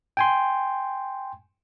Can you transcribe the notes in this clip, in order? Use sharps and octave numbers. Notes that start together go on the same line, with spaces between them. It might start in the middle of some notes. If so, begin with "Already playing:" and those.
G5 G#5 C6